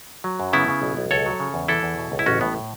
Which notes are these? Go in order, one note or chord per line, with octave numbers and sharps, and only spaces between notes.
F#3
F#2
C#3 B3 E4
C#3
B1
B1
C#2 A4 C#5
F#3
C#3
E2
E3 E4 A4
E2
B2
C#2
E4
A1 C#4 F#4
A2 B3